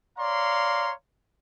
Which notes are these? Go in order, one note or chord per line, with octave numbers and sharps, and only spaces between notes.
C#5 D5 F5 A#5 C6